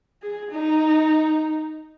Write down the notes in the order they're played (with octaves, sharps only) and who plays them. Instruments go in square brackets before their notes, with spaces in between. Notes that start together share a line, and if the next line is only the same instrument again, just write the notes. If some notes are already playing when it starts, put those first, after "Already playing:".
[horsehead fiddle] G#4
D#4